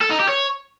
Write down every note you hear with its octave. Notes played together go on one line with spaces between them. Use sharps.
A4
D#4
G4
C#5